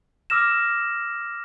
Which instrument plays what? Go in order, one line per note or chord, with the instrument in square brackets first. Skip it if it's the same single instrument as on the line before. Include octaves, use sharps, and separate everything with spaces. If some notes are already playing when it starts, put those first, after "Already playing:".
[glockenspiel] D6 E6 F6 A#6 E7